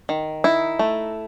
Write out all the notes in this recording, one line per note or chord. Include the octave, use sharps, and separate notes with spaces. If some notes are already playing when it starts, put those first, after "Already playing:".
D#3
D#4 E4
A3